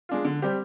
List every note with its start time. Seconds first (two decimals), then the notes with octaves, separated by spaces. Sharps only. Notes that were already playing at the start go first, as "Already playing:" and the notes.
0.09 G#3 D4 F4
0.25 D3
0.42 G3 C4 G4